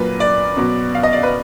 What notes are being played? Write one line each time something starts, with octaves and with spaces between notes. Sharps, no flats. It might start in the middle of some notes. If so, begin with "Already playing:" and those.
Already playing: A#2 F#3 A#3 F4 B4
D5
B2 F#3 B3
F5
D#5
D5
B4